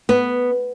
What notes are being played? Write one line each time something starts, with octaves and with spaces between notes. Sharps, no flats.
B3